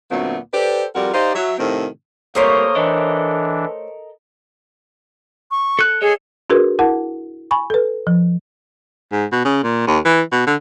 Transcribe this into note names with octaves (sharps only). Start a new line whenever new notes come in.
D2 A#2 F#3 A3 B3 C4
G4 A4 B4 C5 D5
F2 G3 F4 F#4 A#4
D#4 G4 C5 D5 D#5 F5
F#3 E5
A2 C3 D#3 F3 C4
C2 A3 A#3 G4 A#4 C5 C#5 D#6
E3 D4 A4 A#4 D#5
C#6
A4 F#6
G#4 A4 C#5 D#5
D4 F#4 G#4 A#4 B4
E4 A#4 F#5 A5
G#5 B5 C#6
A4 B4
F3
G#2
B2
C#3
A#2
D#2
E3
B2
D3